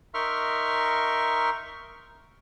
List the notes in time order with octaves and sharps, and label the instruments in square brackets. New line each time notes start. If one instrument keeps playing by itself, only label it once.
[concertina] D#4 A#4 E5 C6 C#6 F6